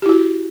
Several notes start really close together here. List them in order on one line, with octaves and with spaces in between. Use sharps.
G4 E4 F#4